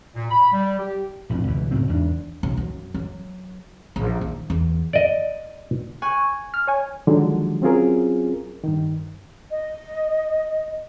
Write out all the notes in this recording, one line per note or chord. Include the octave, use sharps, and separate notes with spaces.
A#2
B5
G3
G4
A#1 F2 A2
C#2 B2 E3
G#2 C#3 F#3 C4
E2 G#2 A3 D4
B1
F#2
F#3
A#1
D#3
E2
D5 D#5
G#5 C#6 F#6
F6
C#5 G#5
D3 D#3 F3 F#3 G#3
F#3 C4 C#4 F4 G#4 A#4
G2 D#3
D#5